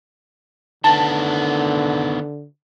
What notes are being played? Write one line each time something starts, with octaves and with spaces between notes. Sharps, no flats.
D3 D#3 B3 A5